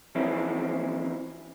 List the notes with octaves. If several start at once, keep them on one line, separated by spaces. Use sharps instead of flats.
E3 F3 C4 C#4 D#4 E4